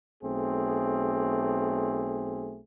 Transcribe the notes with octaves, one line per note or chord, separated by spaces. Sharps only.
B1 A3 C4 G#4